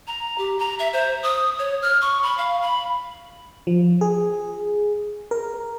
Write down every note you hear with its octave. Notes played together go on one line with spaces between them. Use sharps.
A#5
G4
A#5
E5
C5
D#6
C#5
F6
C#6
B5
F5
B5
F3
G#4
A#4